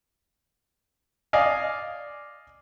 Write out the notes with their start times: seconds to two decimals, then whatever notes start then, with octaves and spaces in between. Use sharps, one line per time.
1.33 D5 D#5 F5 G#5